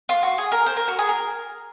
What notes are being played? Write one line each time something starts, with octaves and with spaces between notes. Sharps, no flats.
F4
F#4
G#4
A#4
C5
A#4
F#4
G#4
A#4